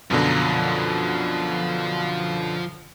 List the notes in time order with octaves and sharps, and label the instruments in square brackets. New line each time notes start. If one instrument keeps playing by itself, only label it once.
[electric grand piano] F#2 B2 D3 [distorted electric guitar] F3 A#5